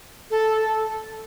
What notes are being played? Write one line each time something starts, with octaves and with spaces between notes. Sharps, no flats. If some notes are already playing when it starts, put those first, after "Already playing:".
A4